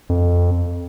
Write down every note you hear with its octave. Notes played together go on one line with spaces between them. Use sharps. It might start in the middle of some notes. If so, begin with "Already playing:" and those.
F2